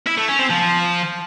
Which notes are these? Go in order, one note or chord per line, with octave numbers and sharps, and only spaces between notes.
E4
A3
C#4
C4
F3